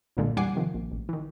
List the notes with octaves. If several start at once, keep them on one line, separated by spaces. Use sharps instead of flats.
B1 G2 A#2 D3 G#3 A#3
E2 G3 F#5 G#5 D6 C7
C3 D#3 F3
A#1
A1
D#3 E3